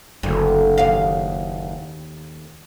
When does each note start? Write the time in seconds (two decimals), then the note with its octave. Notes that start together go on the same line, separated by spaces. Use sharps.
0.23 F#1 D2
0.78 D#2 F5